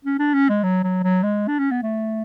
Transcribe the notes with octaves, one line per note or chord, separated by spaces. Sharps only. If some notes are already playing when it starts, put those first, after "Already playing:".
C#4
D4
C#4
G#3
F#3
F#3
F#3
G#3
D4
C#4
B3
A3